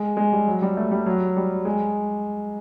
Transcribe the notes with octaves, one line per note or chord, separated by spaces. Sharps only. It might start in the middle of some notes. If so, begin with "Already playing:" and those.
Already playing: G#3
G#3
G3
F#3
G3
A3
G3
F#3
G3
G#3